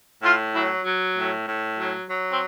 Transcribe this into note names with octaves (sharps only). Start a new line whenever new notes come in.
A2 F4
F#3 E4
F#3
A2
A2
F#3
F#3
C4